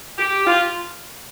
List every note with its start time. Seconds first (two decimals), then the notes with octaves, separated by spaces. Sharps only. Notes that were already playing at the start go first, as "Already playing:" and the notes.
0.18 G4
0.47 F4